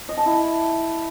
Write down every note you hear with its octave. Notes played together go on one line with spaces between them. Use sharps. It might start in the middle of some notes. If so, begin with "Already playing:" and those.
D#5
A5
E4